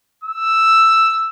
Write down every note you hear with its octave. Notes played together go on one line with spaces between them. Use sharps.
E6